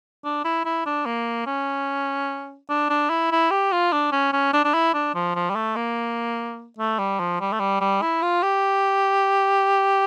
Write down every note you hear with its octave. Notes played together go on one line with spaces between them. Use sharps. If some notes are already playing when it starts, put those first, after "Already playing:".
D4
E4
E4
D4
A#3
C#4
D4
D4
E4
E4
G4
F4
D4
C#4
C#4
D4
D4
E4
D4
F3
F3
G3
A3
A#3
A3
G3
F3
G3
A3
G3
G3
E4
F4
G4